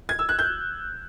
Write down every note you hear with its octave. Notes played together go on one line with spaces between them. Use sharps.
G#6
E6
F#6
G6